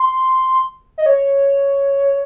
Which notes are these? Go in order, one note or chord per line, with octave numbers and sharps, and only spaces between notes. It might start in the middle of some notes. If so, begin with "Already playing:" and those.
Already playing: C6
D#5
C#5